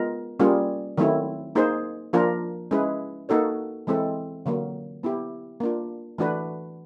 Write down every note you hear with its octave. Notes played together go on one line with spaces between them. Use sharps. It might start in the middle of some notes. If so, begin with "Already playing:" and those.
Already playing: G#3 B3 F4 A#4
G3 A#3 C#4 F4 G#4
D#3 F#3 A3 C4 E4
A#3 D#4 G#4 C5
F3 A#3 D4 F4 A#4
G#3 C#4 E4 G#4 B4
A#3 D#4 F#4 A4 C#5
E3 G#3 C4 E4 A4
D3 F#3 A#3
B3 E4 G4
A#3 D4 F4
E3 A3 D4 F#4 B4